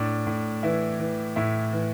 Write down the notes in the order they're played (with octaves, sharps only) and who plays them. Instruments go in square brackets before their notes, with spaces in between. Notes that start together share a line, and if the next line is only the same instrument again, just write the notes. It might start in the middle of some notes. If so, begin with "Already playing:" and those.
Already playing: [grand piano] A2 D4
A2
E3 E4
E3
A2 E4
E3